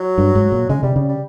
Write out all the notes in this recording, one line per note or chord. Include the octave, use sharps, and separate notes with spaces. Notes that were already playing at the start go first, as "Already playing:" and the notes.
Already playing: F#3
G2
G#2
A#2
C#3 G#3
C3 G3
C#3 G3
G3